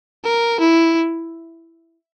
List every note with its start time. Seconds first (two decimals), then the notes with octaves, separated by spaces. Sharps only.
0.24 A#4
0.60 E4